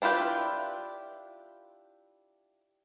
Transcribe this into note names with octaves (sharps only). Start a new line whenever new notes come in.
D4 E4 F4 G4 B4